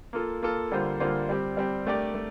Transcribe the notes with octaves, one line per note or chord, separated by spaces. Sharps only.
A#3 F4 A4
A#3 F4 A4
D3 G3 A#3 F4 C5
D3 G3 A#3 F4 C5
G3 C4 G4
G3 C4 G4
A3 D4 G4 A#4 D5
A3